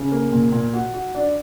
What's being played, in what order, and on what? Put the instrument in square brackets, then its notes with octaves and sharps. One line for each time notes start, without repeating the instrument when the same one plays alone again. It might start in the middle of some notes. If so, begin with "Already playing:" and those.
Already playing: [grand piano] C#3
A#3
A#2
A#2
F#4
F#4
D4